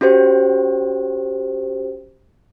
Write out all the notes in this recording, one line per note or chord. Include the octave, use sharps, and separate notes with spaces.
C#4 F#4 G4 C5